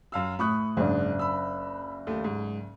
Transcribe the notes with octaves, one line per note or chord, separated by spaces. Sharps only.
F#2 F5 E6
A2 B5 C#6 D#6 F#6
F#1 G#2 D4
B5 E6
D#2 A3
G#2